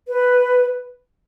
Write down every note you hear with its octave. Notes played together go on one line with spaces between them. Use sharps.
B4